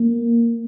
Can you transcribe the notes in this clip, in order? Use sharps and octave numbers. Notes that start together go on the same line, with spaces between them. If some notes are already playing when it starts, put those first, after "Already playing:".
Already playing: A#3